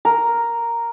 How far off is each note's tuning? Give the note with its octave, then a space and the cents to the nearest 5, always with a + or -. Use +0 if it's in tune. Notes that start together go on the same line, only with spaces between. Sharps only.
A#4 +0 A#5 +0